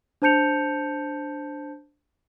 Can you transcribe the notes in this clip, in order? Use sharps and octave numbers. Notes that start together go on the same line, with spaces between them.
D4 C5 A5 G6 C#7 F7